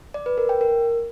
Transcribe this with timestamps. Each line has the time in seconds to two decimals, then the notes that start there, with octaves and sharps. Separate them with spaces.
0.14 D5
0.26 B4
0.38 A#4
0.49 G5
0.61 A#4